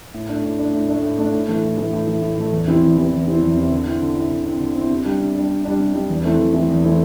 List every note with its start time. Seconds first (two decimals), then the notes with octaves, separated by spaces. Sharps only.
0.14 A2
0.29 A3 D4
0.44 A2
0.59 A3 D4
0.74 A2
0.89 A3 D4
1.03 A2
1.18 A3 D4
1.33 A2
1.48 E3 A3
1.64 A2
1.77 E3 A3
1.93 A2
2.07 E3 A3
2.22 A2
2.37 E3 A3
2.53 E2
2.67 C3 E3 C4 E4
2.82 E2
2.97 C3 E3 C4 E4
3.12 E2
3.27 C3 E3 C4 E4
3.42 E2
3.57 C3 E3 C4 E4
3.71 D3
3.86 C4 E4
4.02 D3
4.16 C4 E4
4.31 D3
4.46 C4 E4
4.60 D3
4.75 C4 E4
4.90 C3
5.05 G3 D4
5.20 C3
5.35 G3 D4
5.50 C3
5.65 G3 D4
5.80 C3
5.94 G3 D4
6.09 E2
6.24 E3 A3 C4 E4
6.39 E2
6.54 E3 A3 C4 E4
6.69 E2
6.84 E3 A3 C4 E4